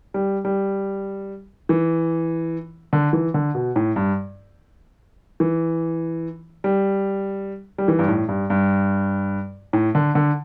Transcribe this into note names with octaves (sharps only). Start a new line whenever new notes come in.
G3
G3
E3
D3
E3
D3
B2
A2
G2
E3
G3
G3
E3
G2
A2
G2
G2
A2
D3
D3